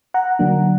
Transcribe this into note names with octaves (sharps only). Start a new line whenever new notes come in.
F#5 A#5
D3 F#3 A#3 D4